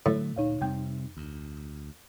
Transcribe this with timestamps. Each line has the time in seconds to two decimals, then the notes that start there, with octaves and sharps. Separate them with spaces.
0.06 A2 D3 F#3 A3
0.36 D2 A#2 D#4 C#5 F5
0.61 F2 C3 G3 C4 G5 G6
1.17 D2